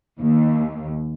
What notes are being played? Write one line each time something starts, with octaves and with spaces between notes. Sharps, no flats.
D#2